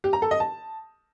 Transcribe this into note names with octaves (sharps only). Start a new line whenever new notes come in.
G4
A#5
A4
D#5
A5